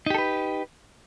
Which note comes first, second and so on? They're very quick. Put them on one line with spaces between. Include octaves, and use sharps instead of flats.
D#4 G4 A4 B4